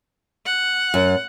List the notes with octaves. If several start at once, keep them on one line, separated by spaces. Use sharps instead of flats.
F#5
F#2